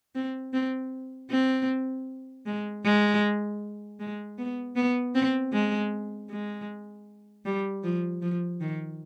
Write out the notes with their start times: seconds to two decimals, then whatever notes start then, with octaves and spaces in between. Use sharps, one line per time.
0.15 C4
0.53 C4
1.31 C4
2.46 G#3
2.84 G#3
4.00 G#3
4.38 B3
4.76 B3
5.15 C4
5.53 G#3
6.30 G#3
7.45 G3
7.84 F3
8.22 F3
8.61 D#3